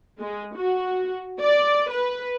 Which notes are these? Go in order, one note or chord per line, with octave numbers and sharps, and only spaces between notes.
G#3
F#4
D5
B4